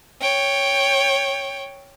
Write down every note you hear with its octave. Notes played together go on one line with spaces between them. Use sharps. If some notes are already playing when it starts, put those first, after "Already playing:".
C#5 G5